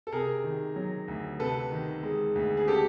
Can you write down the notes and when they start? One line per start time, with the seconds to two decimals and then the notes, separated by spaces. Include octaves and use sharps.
0.07 A4
0.12 C3 G#4 A#4
0.44 D#3
0.76 F#3
1.08 D2
1.39 C3 A4 B4
1.72 D#3
2.03 G#3
2.35 D2
2.57 G#4
2.68 C#3 G4 A4